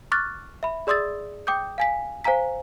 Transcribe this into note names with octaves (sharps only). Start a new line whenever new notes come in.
C#6 D6 F6 F#6 A6
E5 B5
G#4 D5 C6 D#6 E6 A6
G5 D6 D#6 G6
F5 G#5 B6
C5 F5 G#5 A#5 B6